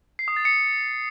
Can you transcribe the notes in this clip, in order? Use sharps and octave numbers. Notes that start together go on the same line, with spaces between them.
C7
D#6
A6
C#7